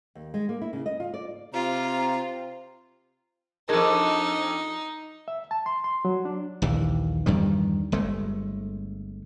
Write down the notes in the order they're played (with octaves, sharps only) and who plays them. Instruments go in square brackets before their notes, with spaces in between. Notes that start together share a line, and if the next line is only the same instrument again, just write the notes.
[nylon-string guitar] D#2
G#3
A#3
E4
C#3
D#5
F4
D5
[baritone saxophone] C3 [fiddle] C4 F4 [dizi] A#5
[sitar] F2 D4 [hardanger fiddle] D#4 [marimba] G#4 A#4
[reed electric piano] E5
A5
C6
C6
F#3
D4
[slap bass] A#1 D#2 E3
E2 G2 D#3 G3
G1 G#3 A3